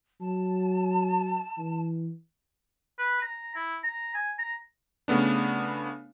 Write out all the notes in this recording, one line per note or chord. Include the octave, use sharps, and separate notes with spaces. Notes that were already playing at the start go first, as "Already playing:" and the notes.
F#3 A5
E3
B4
A#5
E4
A#5
G#5
A#5
C#3 A3 B3 D4